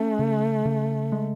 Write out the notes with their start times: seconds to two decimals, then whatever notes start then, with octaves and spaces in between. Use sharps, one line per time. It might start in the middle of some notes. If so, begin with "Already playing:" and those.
Already playing: A3 C#4
0.19 C#3
0.65 C#3
1.12 G#3